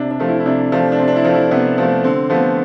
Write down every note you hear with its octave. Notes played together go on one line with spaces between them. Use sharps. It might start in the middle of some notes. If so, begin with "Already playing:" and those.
Already playing: C3 D4
D4
F3 A3
E4
E4
C3 D4
F3 A3 D4
D4
C3 C4
D4
E4
F3 A3
E4
C3 B3
F3 A3
D3 C4
F3 A3 B3